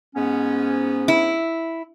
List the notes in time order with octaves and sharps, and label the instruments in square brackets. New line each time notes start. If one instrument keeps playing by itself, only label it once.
[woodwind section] G#2 B3 C#4
[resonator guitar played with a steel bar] E4